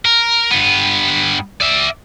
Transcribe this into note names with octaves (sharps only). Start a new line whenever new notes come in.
A#4
G2 B3
D5 E5